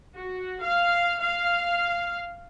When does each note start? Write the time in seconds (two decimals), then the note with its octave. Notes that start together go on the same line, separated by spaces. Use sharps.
0.16 F#4
0.61 F5
1.21 F5